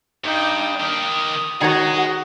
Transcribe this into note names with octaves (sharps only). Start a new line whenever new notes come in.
G2 D#4 G5
D#3 G4 D#6
D#3 F#4 G#4 C#5 D#5 A#5